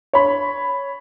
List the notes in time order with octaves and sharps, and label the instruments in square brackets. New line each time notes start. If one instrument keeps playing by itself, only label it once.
[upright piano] C#5 B5